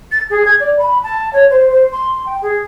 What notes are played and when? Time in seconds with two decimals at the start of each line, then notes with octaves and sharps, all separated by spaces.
0.11 A6
0.29 G#4
0.44 G#6
0.59 D5
0.78 B5
1.03 A5
1.33 C#5
1.50 C5
1.69 C5
1.92 C6
2.25 G5
2.41 G#4